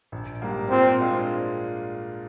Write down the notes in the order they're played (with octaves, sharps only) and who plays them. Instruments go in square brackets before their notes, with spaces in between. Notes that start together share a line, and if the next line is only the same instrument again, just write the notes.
[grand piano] A#1
G#2 G3 A#3
[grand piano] A#2 [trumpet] C4
[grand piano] G#3 D4 F4